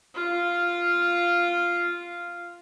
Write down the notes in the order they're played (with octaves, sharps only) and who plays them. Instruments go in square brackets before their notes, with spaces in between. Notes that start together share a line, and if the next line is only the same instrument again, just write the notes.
[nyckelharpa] F4 F5